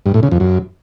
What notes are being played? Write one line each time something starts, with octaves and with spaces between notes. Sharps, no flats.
G2
A2
C#3
F2
F#2